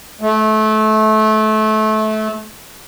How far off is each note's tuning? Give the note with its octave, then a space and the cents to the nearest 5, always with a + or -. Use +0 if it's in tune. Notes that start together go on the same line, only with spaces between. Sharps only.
A3 -25